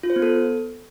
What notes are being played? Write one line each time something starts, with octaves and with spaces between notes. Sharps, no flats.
F4
C5
B3
A4